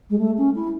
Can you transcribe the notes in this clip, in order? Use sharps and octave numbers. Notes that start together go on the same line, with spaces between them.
G#3
A3
C#4
E4